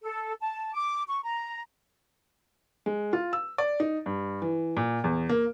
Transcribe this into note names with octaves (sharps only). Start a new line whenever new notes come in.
A4
A5
D6
C#6
A#5
G#3
F4
E6
D5
D#4
G2
E3
A#2
E2
A#3